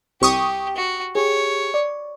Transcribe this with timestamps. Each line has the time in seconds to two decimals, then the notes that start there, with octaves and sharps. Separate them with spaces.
0.21 C2 G4 C#6 D#6
0.76 F#4
1.15 G4 G#4 C#5
1.74 D5